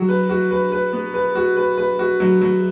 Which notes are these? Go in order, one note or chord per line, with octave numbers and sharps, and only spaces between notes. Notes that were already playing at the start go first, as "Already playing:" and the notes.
Already playing: F#3 F#4
B4
F#4
B4
B4
B3
B4
F#4
B4
B4
F#4
F#3
F#3